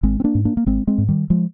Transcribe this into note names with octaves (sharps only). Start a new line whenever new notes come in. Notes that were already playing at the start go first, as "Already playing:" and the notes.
G#1 G#3 C4
C4
A#3 D4
G#2
A#3 D4
A#3
G#1 G#3 C4
G#3 C4
G#2
D#3 G3
F3 G#3